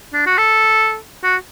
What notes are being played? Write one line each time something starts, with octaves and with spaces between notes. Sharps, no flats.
D4
F#4
A4
F#4